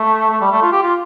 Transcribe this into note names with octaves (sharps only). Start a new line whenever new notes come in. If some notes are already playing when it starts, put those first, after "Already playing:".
Already playing: A3
A3
G3
A3
F4
G4
F4